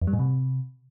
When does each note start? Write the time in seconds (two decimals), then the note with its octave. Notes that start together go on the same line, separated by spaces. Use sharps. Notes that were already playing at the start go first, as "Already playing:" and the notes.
0.02 F2
0.07 G3
0.13 A2
0.19 C3